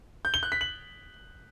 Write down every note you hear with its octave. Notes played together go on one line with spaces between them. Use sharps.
G6
G7
F#6
B6
F#7